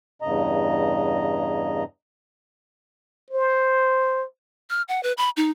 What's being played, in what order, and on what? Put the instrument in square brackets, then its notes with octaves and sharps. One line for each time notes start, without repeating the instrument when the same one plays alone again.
[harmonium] E2 G2 C#3 D#5 A#5
[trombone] C5
[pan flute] F6
F#5
B4
B5
D#4